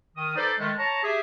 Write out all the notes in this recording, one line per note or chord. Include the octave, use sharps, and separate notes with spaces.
D#3 D#6
D#4 A4 B4 C5 D5
D#3 G#3 A3
C#5 A5 A#5
G4 G#4 E5